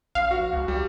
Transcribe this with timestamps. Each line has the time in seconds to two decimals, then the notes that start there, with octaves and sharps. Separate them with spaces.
0.15 A#1 F5
0.31 F#4
0.53 C#2
0.68 C2 G3